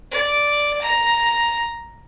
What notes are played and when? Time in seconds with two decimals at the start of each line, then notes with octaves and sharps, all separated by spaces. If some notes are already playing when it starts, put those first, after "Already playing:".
0.11 D5
0.81 A#5